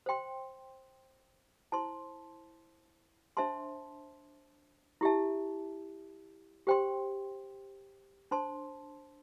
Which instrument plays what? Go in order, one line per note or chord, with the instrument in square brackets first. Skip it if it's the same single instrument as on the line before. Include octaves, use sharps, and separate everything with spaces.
[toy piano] C5 G5 C6
E4 C5 A5 C6
D4 C5 E5 A5 C6
E4 G4 E5 A5
G4 C5 G5 C6
D4 C5 A5 C6